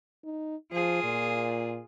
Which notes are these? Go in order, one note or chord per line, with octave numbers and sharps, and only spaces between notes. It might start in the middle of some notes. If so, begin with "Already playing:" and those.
D#4
F3 F4 G#4
A#2